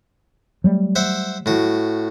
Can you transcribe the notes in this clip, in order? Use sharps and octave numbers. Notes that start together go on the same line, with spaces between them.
F#3 G3 A3
C5 E5 F#5
A2 F#4